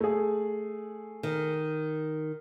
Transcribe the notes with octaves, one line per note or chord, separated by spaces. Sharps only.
A3 G#4
D#3